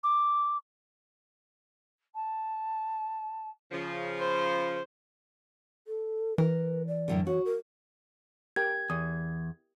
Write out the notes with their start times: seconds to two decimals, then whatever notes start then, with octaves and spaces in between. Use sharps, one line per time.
0.04 D6
2.15 A5
3.71 C#3 F3
4.19 C5 B5
5.86 A4
6.38 E3 A#4 B4
6.87 D5
7.08 F#2 A2 D3
7.27 F#4 C#5
7.45 A#4
8.56 G4 A#4 G5 G#6
8.90 E2 D#6